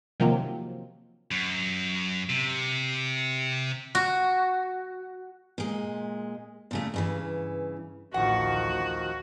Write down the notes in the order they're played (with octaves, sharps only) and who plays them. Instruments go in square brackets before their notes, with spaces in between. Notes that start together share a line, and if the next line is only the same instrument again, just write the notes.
[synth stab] C3 D#3 F3 F#3 A#3 C4
[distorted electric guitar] F#2
C3
[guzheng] F#4
[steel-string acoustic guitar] A#2 G#3
A#2 C#3 A3
G2 C#3 E3
[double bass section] A1 D2 [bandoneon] D#3 F3 [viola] F#4 [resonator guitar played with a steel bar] F#5